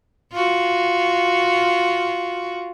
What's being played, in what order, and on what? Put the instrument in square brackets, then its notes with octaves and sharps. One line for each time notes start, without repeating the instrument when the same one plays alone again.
[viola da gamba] F4 F#4